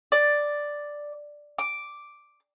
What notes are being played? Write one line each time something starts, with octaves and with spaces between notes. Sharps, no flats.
D5
D6